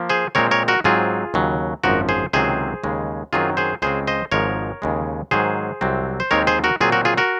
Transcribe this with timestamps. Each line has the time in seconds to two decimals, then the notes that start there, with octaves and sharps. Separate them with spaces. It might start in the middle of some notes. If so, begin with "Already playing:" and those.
Already playing: F3 A#3
0.09 G#4 C5
0.35 A#2 G#3 C4 A#4 C#5
0.51 A#4 C#5
0.68 F#4 A#4
0.84 G#2 F#3 C4 F4 G#4
1.34 D#2 C#3 F#3
1.83 G#1 F#2 F3 F#4 A#4
2.09 G#4 C5
2.33 C#2 C3 D#3 F#3 C4 G#4 C5
2.84 D#2 C#3 G#3
3.33 F#2 D#3 F#3 C4 F4 G#4
3.57 G#4 C5
3.82 C#2 C#3 G#3 C4 G#4 C5
4.07 C5 D#5
4.32 G#1 G#2 F3 G#3 A#4 C#5
4.82 D#2 C#3 G#3
5.31 G#2 D#3 F#3 G#4 C5
5.81 C2 C3 F#3 C4
6.20 C5
6.31 D#2 D#3 G#3 C4 A#4 C#5
6.47 G#4 C5
6.64 F#4 A#4
6.81 A#2 F#3 C4 F4 G#4
6.92 F#4 A#4
7.05 F4 G#4
7.18 F#4 A#4